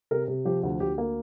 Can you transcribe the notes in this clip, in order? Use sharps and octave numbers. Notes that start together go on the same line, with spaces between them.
C3 A#4
C3
F3 G4
D2
D2 G4
A#3